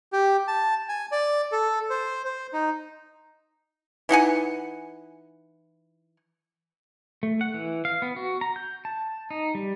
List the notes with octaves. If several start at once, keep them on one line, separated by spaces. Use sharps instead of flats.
G4
A5
G#5
D5
A4
C5
C5
D#4
E3 D#4 F#5 G#5
A3
F#5
E3
F5
B3
F#4
A#5
G6
A5
D#4
G3